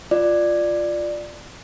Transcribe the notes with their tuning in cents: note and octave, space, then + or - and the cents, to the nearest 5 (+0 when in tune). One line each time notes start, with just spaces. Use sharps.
F4 +0 D5 +10